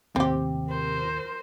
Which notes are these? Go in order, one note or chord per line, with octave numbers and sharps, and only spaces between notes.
D#2 A2 C3 C4 G4
A#4 C5